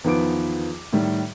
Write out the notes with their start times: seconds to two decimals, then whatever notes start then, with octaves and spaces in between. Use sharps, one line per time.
0.04 E2 D#3 F3 B3 D6 D7
0.93 A2 D#3 G3